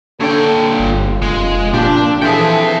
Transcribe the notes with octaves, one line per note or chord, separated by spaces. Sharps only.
A#2 D3 A4 C#5 G5
G1 F4
F1 G#3 F5
A#2 F3 C4 D4 G4
E3 F3 C4 G#4 A4 E5 G5